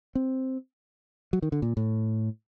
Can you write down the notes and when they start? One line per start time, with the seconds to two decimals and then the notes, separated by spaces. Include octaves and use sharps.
0.15 C4
1.33 F#3
1.42 D#3
1.52 D3
1.62 A#2
1.77 A2